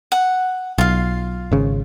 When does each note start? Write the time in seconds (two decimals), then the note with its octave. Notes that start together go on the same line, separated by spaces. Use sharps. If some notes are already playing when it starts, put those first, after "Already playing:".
0.12 F#5
0.78 B1 F4 F5
1.52 G#1 C#3